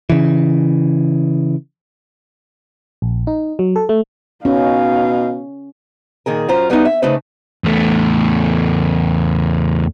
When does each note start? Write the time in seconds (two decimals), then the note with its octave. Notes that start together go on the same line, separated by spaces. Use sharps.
0.10 C#3 E3
3.02 A#1
3.27 D#4
3.59 F#3
3.76 A4
3.89 A3
4.45 B2 C#4 D#4 F5
6.26 A#2 D#3 G#4 A#4
6.48 F#2 C#4 F4 C5 A#5
6.70 G3 B3 C#4 D#4 E4
6.85 E5
7.02 C#3 A3 D4 D#4 B4 C5
7.64 E2 A3